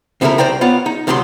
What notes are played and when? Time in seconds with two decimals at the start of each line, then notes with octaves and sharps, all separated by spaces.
0.21 C#3 F3 A3 D#4 E4 A#4
0.38 C2 F3 C5 D5 G5 A#5
0.61 B3 F4 C#5 D5 F#5
0.86 D#4
1.07 D2 C3 F3 F#3 A#5 C6